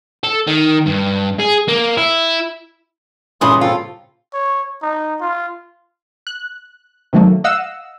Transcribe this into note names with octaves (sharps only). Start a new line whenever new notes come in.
A4
D#3
G2
G#4
A#3
E4
G2 A#2 C#3 E3 C#4 B5 C6 D#6
C4 F4 A4
C#5
D#4
F4
F#6
C3 D#3 F#3 A3 A#3
D#5 F5 F#5 E6